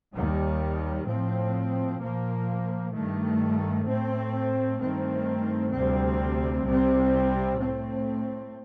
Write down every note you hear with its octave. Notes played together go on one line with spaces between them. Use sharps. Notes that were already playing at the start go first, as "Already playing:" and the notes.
D#2 D#3 G3
A2 F3 C4
A#2 F3 A#3
G2 D#3 A3
A2 A3 C4
G2 D#3 A3 C4
D2 C3 G3 C4
C2 C3 G3 C4
A2 A3 C4